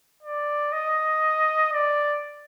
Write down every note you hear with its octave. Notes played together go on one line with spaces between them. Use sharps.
D5
D#5
D5